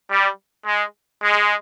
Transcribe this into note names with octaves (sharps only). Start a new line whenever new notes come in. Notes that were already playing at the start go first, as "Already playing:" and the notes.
G3
G#3
G#3